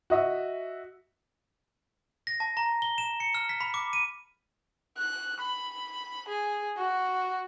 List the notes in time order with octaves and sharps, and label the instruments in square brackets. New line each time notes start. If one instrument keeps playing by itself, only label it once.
[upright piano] F#4 D#5 E5
[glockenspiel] A#6
A5
A#5
G7
E7
C#7
F6
B6
B5
D6
D#7
[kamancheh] F#6
B5
G#4
F#4